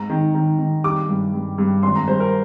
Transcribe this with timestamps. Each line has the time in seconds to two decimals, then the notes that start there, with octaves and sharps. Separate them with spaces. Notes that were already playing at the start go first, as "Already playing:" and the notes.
Already playing: G#2 A#5
0.10 D#3
0.35 D#3
0.59 D#3
0.84 G3 D6
1.09 G2
1.33 G2
1.58 G2
1.83 G#1 C6
1.95 A#5
2.08 G2 C5
2.20 A#4